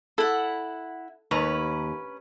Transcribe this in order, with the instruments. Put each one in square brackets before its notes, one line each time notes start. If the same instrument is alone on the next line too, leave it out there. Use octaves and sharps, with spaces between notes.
[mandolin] E4 F#5 [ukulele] A4
[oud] D#2 [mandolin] C#4 B4 A#5